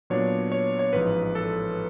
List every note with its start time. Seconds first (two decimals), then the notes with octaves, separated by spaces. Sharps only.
0.10 A#2 F#3 B3 D4 C#5
0.52 C#5
0.79 C#5
0.93 A1 G#2 F3 B4
1.35 A4